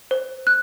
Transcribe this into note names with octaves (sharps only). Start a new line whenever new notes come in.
C5
F#6